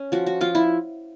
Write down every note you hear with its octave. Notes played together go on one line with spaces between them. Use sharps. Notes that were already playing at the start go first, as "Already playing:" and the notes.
Already playing: C#4
F3 F#4
F#4
F3 F4
E4